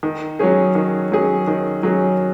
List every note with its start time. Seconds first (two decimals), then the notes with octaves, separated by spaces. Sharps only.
0.03 D#3
0.39 F#3 C#4 G#4
0.75 D#3
1.12 F#3 C#4 G#4
1.47 D#3
1.83 F#3 C#4 G#4